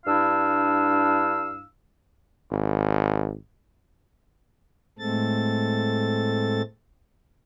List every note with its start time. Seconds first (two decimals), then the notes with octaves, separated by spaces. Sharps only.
0.06 G2 D4 E4 F5 E6
2.51 G#1
4.99 A2 G#3 A3 C4 A4 A6